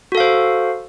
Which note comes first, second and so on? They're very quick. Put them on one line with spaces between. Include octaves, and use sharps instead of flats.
F#4 A4 F5 C5